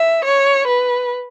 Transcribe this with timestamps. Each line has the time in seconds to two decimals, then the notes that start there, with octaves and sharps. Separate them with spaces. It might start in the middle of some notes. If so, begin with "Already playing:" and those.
Already playing: E5
0.25 C#5
0.67 B4